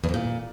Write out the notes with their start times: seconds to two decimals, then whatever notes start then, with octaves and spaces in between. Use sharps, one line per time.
0.04 E2
0.09 F2
0.14 A#2